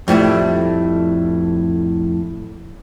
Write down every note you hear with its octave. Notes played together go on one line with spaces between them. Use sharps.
F2 A2 G3 E4